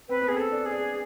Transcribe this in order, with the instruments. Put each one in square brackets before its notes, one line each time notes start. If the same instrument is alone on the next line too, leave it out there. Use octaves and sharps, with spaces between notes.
[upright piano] C4 [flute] B4
[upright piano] B3
[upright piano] C4 [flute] G#4
[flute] A4
[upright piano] D4
[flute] G#4
[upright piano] D4